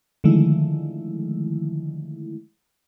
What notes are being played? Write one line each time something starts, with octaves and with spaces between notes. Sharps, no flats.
D3 D#3 F3 G#3 A3 E4